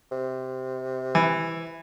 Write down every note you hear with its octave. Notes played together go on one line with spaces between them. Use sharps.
C3
E3